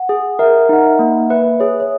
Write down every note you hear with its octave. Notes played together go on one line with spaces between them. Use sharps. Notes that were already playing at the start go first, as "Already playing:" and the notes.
Already playing: F#5
G#4
A#4 E5
D#4 F#5
E5
A#3
B4 E5
G#4 C#5
C#5